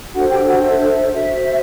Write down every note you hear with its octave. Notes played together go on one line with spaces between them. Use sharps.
D4 F#4 A4 C5 F#5
G4 G5
F#4 F#5
E5
E5
D5
F#4 C5 E5